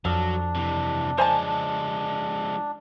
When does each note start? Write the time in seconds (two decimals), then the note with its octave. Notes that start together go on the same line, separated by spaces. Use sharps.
0.05 F2 F3 F#3 D4 A4
0.55 C3 E3
1.18 F3 G#3 C5 G#5 A5